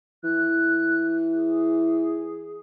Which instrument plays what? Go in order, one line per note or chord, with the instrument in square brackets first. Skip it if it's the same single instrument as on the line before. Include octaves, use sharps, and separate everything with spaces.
[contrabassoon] E3 [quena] F#6
[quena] G#4